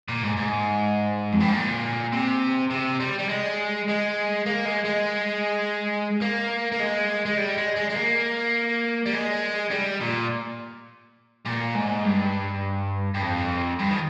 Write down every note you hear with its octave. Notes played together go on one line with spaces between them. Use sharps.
A#2
G#2
G#2
F2
G2
G#2
A#2
C3
C3
G3
G3
G#3
G#3
A#3
G#3
G#3
A#3
A#3
G#3
G#3
G3
G#3
G#3
G#3
A#3
G3
G#3
G3
A#2
A#2
G#2
G2
G2
F2
G2
D#3